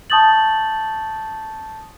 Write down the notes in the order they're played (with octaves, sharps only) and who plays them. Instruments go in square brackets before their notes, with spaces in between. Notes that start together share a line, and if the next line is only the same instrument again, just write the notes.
[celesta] A5 C#6 D#6 G6 A6 F#7